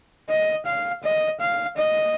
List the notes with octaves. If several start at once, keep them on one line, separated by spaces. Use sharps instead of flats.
D#5
F5
D#5
F5
D#5